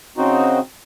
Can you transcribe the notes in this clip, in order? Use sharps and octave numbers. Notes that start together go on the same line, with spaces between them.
C#3 C4 D#4 F#4